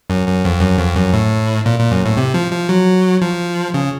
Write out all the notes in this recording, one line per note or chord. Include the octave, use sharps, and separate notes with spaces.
F#2
F#2
F2
F#2
F2
F#2
A2
A#2
A#2
F#2
A2
C3
F3
F3
F#3
F3
C#3